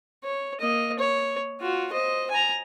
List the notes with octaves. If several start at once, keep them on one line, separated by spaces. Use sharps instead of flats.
C#5
A#3 D#5
C#5
F4 F#4
C5 D#5
G#5 A#5